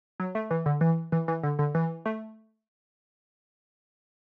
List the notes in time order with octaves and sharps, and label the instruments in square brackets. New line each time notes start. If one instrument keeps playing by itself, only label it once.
[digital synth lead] F#3
A3
E3
D3
E3
E3
E3
D3
D3
E3
A3